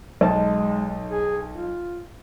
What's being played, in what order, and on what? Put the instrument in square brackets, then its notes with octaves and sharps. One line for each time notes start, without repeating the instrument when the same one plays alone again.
[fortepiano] B1 D#4 A5 [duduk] G#3
[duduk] G#4
F4